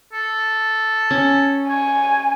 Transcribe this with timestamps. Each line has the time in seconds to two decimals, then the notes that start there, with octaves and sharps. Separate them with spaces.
0.13 A4
1.11 C#4
1.69 C#5 G#5